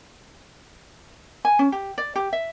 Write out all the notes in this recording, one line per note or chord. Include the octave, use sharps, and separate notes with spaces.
G#5
C#4
G4
D5
G4
E5